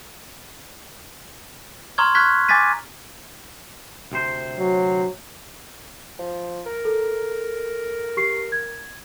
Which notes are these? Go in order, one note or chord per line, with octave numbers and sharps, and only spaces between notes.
A#5 C6 C#6 D#6 F6 G#6
C#6 F6 F#6 G#6 B6
G#5 D6 G#6 A6 B6 D#7
D2 C3 C5
F#3
F3
A#4
A4
G4 C#6 C7
G#6